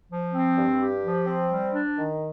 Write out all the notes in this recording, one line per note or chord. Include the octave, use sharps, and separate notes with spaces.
F3
C4
G2
G4
F3
C4
G3
D4
D#3